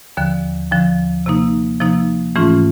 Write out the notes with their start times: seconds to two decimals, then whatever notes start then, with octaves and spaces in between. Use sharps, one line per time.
0.17 D#2 D3 F3
0.71 D#2 D3 F3
1.26 C3 F3 A#3 D#4
1.80 C3 F3 A#3 D#4
2.36 G#2 E3 A3 C#4 F4